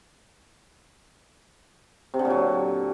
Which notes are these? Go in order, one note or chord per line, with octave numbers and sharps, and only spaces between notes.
C3
D3
A#2
F#3